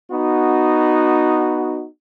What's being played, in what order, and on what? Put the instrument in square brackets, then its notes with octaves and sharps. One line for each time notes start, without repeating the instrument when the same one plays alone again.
[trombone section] B3 D#4 F#4